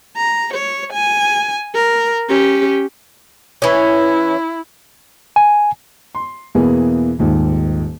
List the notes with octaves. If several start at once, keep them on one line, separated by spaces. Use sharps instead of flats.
A#5
C#5
G#5
A#4
C#4 G4
E3 C#4 E4
G#5
C6
E2 B2 E3 A#3 G#4
D#1 D#2 G#2